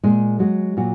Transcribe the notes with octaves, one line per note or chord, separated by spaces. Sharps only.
A#2 G#3 G#4
F#3 G#3 F#4
A#2 F#3 F#4